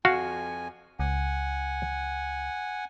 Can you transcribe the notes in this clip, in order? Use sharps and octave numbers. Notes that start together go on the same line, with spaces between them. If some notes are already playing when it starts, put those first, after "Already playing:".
F2 F#4 F5 G#5
C#2 F#5 G#5